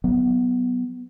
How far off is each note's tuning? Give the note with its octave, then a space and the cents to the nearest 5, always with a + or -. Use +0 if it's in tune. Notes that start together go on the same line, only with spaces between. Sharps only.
F#3 +20 B3 +0